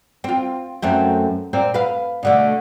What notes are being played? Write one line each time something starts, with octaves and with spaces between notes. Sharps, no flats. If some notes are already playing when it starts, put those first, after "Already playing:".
C4 F4
F#2 A3 C4
A#2 C4 A#4
B4 F5
B2 D3 A3